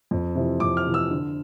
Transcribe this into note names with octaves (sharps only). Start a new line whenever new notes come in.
F2
C3 E3
F2 D6
F6
C3 E3
E6
D3